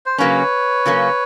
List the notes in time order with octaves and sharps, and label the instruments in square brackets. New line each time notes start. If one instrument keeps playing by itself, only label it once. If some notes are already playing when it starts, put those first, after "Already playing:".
[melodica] C5
[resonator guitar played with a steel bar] C#3 F#3 A#3 C#4 [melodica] B4 C#5
[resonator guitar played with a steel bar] C#3 F#3 A#3 C#4